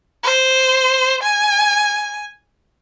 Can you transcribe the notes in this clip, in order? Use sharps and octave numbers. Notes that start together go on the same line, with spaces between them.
C5
G#5